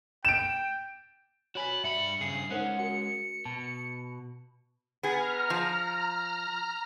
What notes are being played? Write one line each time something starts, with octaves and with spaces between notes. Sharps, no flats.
G5 D7 E7
F#4 C#5 G#5 B5 B6
G2 G3 E5 B5 C#7
G2 C#3 G#4 C7
G#3 C#4 D#4 A#4 C5 F#5
F#4 A#4 C#7
B2 A5
B3 G#4 A#5 F6
F3